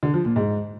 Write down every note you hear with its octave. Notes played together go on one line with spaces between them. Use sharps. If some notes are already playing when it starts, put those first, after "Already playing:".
D3
F3
A#2
G#2